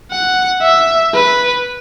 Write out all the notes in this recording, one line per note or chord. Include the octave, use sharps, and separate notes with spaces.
F#5
E5
B4